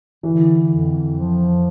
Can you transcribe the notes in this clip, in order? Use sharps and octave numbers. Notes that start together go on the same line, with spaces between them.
D3 E3
F2
F3